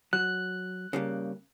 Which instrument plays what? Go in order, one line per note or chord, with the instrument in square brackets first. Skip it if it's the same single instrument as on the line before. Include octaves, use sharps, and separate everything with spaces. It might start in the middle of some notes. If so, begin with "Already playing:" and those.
[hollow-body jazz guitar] F#3 [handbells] F#6
[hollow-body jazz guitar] C#3 G3 A#3